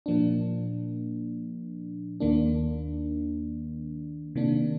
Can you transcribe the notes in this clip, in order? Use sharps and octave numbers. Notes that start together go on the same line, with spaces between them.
A#2 F3 A#3 D4
D#2 D#3 A#3 D4
C3 D#3 A#3 D4